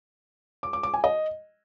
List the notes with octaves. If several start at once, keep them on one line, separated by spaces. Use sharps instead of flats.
D6
D6
D6
G#5
D#5